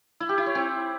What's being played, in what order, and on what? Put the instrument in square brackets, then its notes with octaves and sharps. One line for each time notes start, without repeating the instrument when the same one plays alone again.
[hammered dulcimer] E4
G4
E4
C#5
C4